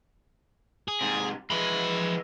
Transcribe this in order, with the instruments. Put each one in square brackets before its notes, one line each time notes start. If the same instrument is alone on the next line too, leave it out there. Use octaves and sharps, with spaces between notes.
[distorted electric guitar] G#4
[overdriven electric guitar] G#2 C3
[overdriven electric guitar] E3 G#3 [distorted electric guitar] F3 B5